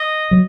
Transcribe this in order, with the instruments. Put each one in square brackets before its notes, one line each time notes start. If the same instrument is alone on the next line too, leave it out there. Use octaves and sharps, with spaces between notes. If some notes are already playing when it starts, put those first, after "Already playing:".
Already playing: [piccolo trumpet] D#5
[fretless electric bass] F#3